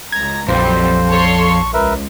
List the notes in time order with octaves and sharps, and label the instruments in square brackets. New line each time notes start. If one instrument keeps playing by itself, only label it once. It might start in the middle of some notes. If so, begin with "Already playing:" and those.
[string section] C#2 A#5 [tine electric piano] G#6
[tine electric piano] A#1 [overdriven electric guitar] F2 [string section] F#3 G3 C4 [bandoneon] C5
[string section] A4 C#5 C6
[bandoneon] C#6
[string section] C#2 [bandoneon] A#4 B4 E5